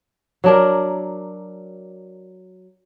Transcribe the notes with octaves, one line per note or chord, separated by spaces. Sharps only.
F#3 D4 A#4